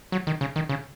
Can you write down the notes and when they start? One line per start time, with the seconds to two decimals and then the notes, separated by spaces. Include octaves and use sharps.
0.12 F#3
0.27 D#3
0.41 C#3
0.56 D#3
0.69 C#3